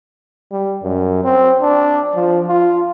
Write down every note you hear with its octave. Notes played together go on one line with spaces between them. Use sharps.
G3
F#2
C4
D4
F3
F4